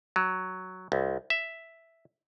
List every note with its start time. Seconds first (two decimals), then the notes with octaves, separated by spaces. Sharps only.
0.16 F#3
0.92 C2
1.30 E5